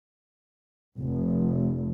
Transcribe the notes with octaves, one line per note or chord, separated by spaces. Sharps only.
F1